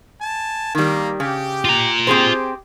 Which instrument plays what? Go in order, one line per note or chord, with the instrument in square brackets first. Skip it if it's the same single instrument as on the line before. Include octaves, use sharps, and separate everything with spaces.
[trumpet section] G#5 A5
[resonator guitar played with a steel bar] D#3 G3 [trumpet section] A#3
[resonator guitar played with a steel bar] C#3 [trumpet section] G4
[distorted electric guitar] F4 A#5
[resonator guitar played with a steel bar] C4 G#4 C5 [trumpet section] G4